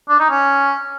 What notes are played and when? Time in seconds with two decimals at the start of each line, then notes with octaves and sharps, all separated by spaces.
0.09 D4
0.19 D#4
0.30 C#4